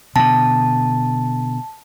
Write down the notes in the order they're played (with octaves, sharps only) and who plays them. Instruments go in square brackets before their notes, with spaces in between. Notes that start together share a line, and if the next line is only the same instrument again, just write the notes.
[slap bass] B2 D3 [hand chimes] A5